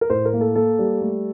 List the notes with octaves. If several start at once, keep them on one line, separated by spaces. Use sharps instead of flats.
A#4
A2 C5
A#4
A#3
A4
A#3 A4
G3
A3